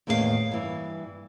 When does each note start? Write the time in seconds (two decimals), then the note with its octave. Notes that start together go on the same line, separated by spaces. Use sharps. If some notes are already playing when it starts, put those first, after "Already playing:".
0.07 E2 A2 D#3 A#3 G4 F5
0.51 G2 E3